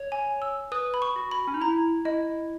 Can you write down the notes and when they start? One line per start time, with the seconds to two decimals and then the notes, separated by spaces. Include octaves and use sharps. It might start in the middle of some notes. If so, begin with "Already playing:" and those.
Already playing: C#5
0.12 G#5
0.42 E6
0.72 B4 D#6
0.94 B5
1.02 C#6
1.16 F#4
1.31 B5
1.47 C#4
1.54 D#4
1.61 E4 A#5
2.05 E4 D#5